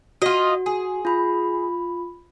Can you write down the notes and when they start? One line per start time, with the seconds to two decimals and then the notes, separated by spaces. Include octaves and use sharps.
0.22 F4 F#4 D#5
0.66 G#4
1.05 F4 B5